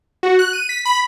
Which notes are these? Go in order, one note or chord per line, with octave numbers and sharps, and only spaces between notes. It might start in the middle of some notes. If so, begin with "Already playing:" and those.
F#4
F#6
D#7
B6
B5